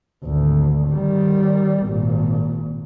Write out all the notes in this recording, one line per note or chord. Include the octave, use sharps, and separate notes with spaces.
G#1 D2
D#3 G3
G#1 A#2